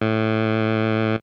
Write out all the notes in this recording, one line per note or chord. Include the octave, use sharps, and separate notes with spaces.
A2